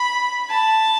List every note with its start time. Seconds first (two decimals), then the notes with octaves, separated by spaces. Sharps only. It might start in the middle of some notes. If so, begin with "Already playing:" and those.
Already playing: B5
0.49 A5